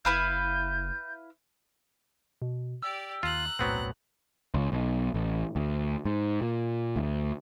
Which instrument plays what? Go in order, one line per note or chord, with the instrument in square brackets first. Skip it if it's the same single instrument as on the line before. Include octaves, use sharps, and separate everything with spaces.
[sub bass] F#1 [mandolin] E4 B4 F5 [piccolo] G6
[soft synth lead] B2
[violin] G4 D5 [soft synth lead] E6
[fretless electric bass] D#2 [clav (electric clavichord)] F4 [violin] A#5 F#6
[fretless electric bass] D#1 B1 A2 [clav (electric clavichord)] F#3 B3 C4
[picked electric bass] C#2
B1
A1
D2
G#2
A#2
D2